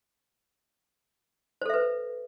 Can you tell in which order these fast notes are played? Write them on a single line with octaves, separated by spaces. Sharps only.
C5 A4 E5 B4